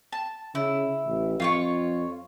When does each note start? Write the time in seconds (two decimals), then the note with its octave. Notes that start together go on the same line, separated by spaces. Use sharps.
0.12 A5
0.55 C#3 E4
1.06 A1
1.40 F2 F4 C#5 C#6